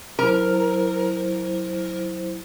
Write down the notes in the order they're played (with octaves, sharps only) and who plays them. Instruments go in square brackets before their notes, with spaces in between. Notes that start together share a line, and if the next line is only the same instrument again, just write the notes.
[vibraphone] F#3 E4 C5 [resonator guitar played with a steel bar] A#4